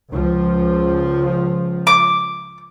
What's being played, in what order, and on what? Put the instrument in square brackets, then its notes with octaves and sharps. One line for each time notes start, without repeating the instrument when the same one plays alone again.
[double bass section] C#2 F3
[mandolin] D6